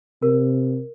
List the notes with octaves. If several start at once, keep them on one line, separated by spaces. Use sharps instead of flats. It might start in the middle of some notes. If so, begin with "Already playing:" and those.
C3 A#4